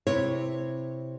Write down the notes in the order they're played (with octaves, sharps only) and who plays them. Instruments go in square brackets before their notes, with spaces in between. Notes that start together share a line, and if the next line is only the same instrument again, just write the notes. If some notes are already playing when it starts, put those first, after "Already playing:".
[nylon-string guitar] C3 E4 B4 C#5